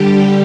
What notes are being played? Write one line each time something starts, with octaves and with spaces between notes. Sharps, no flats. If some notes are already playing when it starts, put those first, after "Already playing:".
Already playing: D3 G3 G4